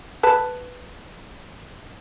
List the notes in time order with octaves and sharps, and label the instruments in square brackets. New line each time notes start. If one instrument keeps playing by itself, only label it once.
[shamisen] B4 A5